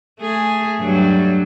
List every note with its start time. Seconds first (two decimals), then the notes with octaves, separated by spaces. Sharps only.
0.20 A3 G#4
0.79 G2 F#3 G3